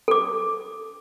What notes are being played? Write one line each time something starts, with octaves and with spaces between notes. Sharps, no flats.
A4 D6